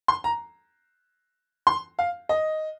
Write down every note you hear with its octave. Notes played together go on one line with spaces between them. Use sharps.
C6
A#5
C6
F5
D#5